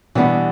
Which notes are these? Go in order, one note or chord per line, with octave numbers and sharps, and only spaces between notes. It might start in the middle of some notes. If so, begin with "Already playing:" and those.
B2 E3 G3 B3 D4